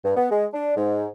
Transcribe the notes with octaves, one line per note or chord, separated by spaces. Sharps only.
G2
B3
G#3
D4
G#2